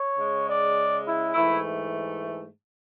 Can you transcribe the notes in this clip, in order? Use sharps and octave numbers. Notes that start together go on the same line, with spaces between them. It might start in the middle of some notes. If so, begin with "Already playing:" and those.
Already playing: C#5
C#3 G#3
D5
E4
G#2 E3 A3 E4